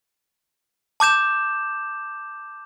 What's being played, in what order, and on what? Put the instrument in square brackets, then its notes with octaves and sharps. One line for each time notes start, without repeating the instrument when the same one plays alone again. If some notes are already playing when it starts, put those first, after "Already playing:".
[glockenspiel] A5 D6 G6 E7